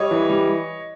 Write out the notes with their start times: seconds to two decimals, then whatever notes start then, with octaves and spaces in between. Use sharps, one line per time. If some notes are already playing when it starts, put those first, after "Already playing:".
Already playing: G3 C#5 D#5
0.11 E3
0.30 G3